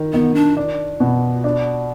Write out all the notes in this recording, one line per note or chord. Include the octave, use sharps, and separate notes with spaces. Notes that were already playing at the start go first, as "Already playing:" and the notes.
Already playing: D#3
D#3 B3
D4
D4
B2
D4